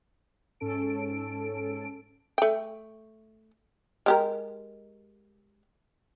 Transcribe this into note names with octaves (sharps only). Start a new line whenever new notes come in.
G#2 C#4 A4 D7
A3 G5
G#3 G4 A#4